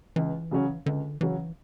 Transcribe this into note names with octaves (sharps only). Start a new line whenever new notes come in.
C#2 E3
C#3 F#3 C#4
C#2 D3
C#3 E3 F#3 C#4